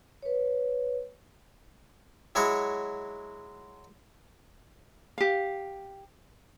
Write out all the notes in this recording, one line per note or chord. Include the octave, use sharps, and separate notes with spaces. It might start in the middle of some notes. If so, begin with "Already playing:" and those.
B4 C#5
F#3 G#3 E4 F#4 C#5
G4 F5